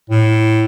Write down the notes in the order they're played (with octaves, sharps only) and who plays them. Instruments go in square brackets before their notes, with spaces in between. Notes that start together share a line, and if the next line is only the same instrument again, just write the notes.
[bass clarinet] A2